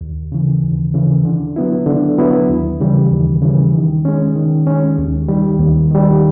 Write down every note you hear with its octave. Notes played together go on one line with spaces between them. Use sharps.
D#2
C#3 E3
D#2
C#3 E3
D3
F#3 B3 E4
D3
F#3 B3 E4
D#2
C#3 E3 G3
D#2
C#3 E3 G3
D#3
G#3 C#4
D#3
G#3 C#4
D#2
D#3 G3
D#2
D#3 G3